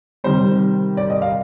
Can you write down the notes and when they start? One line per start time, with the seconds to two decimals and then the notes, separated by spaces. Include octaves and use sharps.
0.24 C3 D#3 G3 C4 C5
0.97 D5
1.10 D#5
1.22 F5